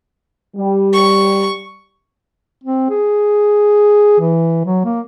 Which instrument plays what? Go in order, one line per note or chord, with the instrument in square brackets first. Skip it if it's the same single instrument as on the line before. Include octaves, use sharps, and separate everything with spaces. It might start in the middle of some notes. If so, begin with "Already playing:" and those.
[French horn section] G3
[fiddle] C#6
[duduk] C4
G#4
E3
F#3
A#3